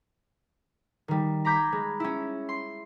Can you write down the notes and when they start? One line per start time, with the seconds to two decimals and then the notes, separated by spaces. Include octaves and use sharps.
1.08 D#3 G3
1.45 A#5 B5 D6 G6 G#6 B6
1.72 G#3
2.00 C#4 E4
2.49 C6